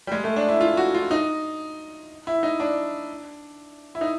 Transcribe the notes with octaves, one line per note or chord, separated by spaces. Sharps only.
G3
G#3
A3
D4
E4
F4
F#4
F4
D#4
E4
D#4
D4
E4
D#4